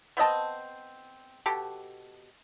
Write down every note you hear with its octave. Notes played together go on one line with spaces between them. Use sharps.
B3 C4 D#5 A5
B2 G4 A4